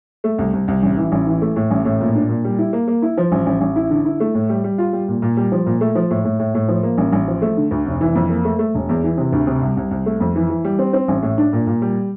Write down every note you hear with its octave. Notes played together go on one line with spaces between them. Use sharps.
A3
C2
C2
C2
A1
E3
A1
E3
A3
A2
A1
A2
A#2
D4
A#2
G3
E4
A#3
A#3
E4
F3
A1
A1
A1
E4
D3
E4
A3
A2
G3
G3
F4
G3
A#2
A#2
G3
F3
A#2
A3
F3
A2
A2
A2
A2
F3
A#3
A1
A1
F3
A3
D3
D2
F1
E3
F2
A#3
A3
A3
E1
E2
E3
C3
D2
C3
C2
C2
C2
A3
F2
E3
E3
G3
C4
C4
A1
A2
D4
A#2
A#2
G3